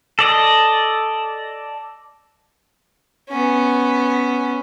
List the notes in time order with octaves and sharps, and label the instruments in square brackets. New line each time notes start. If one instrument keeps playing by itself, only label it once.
[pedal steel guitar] A4 D5 D#5
[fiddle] B3 C#4